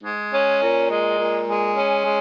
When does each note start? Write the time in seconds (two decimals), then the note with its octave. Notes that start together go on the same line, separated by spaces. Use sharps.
0.03 G#3
0.31 C#4
0.60 A#2
0.89 G#3
1.18 A#2
1.46 G#3
1.76 C#4
2.04 G#3